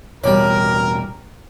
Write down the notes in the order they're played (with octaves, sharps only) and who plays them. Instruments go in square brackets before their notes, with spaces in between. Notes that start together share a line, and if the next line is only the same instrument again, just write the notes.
[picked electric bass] E1 A1 B2 [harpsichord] G3 D5 [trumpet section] A#4 [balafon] C#5